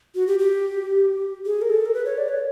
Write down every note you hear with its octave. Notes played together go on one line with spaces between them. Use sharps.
F#4
G4
G4
G#4
A#4
A4
A#4
B4
C#5
D5
C#5